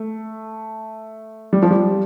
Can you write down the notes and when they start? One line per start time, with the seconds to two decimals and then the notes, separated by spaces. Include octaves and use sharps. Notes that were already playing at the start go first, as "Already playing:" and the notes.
Already playing: A3
1.53 G3
1.63 F3
1.71 G3